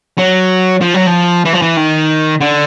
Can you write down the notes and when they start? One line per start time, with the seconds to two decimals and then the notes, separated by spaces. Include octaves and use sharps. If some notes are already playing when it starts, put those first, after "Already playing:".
0.18 F#3
0.81 F3
0.94 F#3
1.07 F3
1.45 E3
1.53 F3
1.62 E3
1.77 D#3
2.41 D3